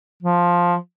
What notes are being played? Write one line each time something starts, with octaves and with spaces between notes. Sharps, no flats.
F3